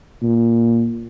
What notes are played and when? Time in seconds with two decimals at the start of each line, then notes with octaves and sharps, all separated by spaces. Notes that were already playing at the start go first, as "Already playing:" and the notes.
0.22 A#2